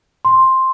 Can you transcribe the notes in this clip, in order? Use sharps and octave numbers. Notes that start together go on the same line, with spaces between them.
C6